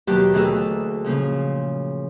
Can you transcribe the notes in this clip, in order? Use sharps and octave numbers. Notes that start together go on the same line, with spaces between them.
D#2 B2 F#3 G4 A5 F#6
D2 E3 G#4 A#4 A5 E6
A#2 C#3 F3